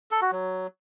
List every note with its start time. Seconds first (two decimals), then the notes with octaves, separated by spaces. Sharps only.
0.11 A4
0.22 F#4
0.32 F#3